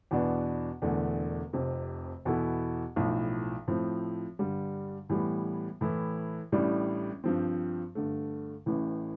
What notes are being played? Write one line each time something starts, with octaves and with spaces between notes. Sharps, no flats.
E2 B2 B3 D4
E1 E2 D3 A3 D4
F1 F2 C3
E2 B2 B3 E4 A4
B1 A2 F3
A2 F3 C4
G2 D3 G3
A2 E3 G3 B3
A2 E3 A3 E4
A1 A2 G3 D4
G2 F3 C4
G2 D3 A3
A1 A2 E3